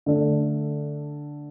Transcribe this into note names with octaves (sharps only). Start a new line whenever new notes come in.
D3 A3 D4